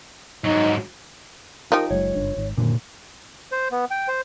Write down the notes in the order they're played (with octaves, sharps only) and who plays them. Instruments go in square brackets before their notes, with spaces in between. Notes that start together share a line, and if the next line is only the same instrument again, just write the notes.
[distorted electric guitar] G#2 F#3 [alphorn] D#4
[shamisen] F3 D#4 G4 [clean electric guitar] A#4
[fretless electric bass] F#1 F#3 G#3 [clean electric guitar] C#5
[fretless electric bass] F#1 G2 D4
G#1 G#2 D#3
[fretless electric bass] F#2 D#3 A#3 [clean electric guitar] A#2 D3
[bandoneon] C5
B3
G5
C5